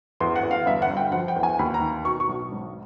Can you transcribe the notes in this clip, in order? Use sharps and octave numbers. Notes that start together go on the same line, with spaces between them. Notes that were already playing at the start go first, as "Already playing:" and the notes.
E2 C6
F#5
E2
F5
G1 E5
F#5
G1
G5
F3 F#5
G5
E2
G#5
D#2 B5
A#5
D#3
B2 C#6
C#6
B1
G#1